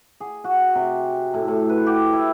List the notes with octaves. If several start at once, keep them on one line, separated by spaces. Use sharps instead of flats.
G#4
F#4
C3
A2
A2
B4
G4
E4